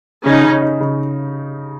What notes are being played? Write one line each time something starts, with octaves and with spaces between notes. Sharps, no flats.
C#3 C#4 D#4
C#3
D#4
C#3